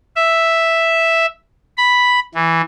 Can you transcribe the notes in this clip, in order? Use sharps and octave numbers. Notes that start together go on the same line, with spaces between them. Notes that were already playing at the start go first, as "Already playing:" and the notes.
E5
B5
E3